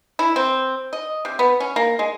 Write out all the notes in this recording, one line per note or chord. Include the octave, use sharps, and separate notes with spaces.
E4
C4
D#5
C3
B3
C#4
A#3
G#3